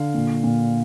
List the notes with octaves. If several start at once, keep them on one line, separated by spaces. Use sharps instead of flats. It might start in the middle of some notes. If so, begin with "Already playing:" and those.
Already playing: D3 F5
A#2
A#2